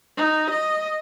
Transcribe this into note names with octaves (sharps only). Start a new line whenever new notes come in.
D#4
D#5